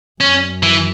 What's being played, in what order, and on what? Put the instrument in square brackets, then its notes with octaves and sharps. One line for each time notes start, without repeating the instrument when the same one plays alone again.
[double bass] F#2 [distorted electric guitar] C#4
[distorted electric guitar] E3